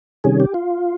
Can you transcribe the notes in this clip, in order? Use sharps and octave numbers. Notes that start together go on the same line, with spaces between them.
C3 D#3 G3 C#4 G#4
G4
F4